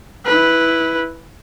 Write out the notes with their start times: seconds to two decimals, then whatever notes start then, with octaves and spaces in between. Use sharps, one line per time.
0.25 E4 B4